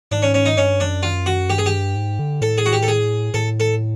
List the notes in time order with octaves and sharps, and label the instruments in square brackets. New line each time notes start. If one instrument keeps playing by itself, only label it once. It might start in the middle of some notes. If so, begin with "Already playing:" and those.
[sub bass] G#2 [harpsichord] D4
[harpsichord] C#4
C#4
D#4
[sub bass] G2 [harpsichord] C#4
[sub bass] F#2 [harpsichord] D4
[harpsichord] F4
F#4
[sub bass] G2 [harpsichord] G4
[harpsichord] G#4
G4
[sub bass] G#2
D3
[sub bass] A2 [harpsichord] A4
[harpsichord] G#4
F#4
G4
A4
G#4
[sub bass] A2 [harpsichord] A4
[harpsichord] A4